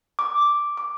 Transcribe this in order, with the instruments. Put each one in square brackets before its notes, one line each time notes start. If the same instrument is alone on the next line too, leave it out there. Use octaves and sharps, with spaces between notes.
[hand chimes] D6
D6